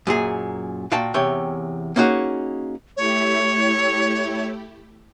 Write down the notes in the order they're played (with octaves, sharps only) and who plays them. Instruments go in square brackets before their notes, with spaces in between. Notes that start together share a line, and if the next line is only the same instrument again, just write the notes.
[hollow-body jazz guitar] F#2 A#2 G#4
A#2 F#4 F5 G5 A5
E2 C3 C#5 G5
A#3 C#4 D#4 F#4 G#4
[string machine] A3 E4 G4 [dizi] C#5